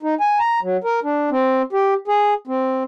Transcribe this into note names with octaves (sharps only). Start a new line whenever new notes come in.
D#4
G#5
A#5
F#3
A#4
D4
C4
G4
G#4
C4